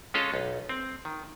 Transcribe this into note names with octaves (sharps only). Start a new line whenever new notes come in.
G#3 C#4 F4 A4 D#5 F5
B1
C4
D#3